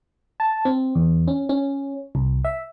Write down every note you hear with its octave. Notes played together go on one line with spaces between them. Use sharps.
A5
C4
E2
C#4
C#4
C2
E5